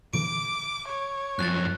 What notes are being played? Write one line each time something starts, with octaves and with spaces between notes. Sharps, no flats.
A#2 D3 E3 D6 D7
C#5
F#2 F3 F#6 A6